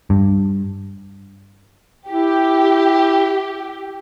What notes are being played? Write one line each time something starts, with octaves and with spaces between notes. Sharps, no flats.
G2
E4 G4